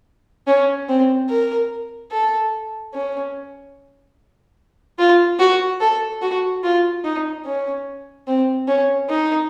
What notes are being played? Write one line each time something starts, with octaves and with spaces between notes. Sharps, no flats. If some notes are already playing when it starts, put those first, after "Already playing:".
C#4
C4
A#4
A4
C#4
F4
F#4
A4
F#4
F4
D#4
C#4
C4
C#4
D#4